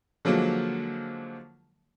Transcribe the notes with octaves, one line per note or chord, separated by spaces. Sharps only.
D3 F3 F#3 G#3 A#3